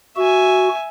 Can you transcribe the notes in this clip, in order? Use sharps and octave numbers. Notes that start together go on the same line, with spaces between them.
F#4 E5 G#5